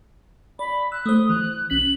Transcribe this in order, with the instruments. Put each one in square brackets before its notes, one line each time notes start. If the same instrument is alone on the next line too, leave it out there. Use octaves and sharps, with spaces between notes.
[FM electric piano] D5 [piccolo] B5
[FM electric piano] E6 [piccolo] F#6
[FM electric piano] A3 C5 [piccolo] D#6
[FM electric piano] E3 [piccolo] F#6
[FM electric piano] B1 C#4 B6 [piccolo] F#7